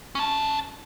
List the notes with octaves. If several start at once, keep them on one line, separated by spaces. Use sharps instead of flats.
C#4 A5